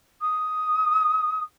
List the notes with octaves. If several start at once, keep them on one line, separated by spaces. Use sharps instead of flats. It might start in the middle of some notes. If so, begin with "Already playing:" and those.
D#6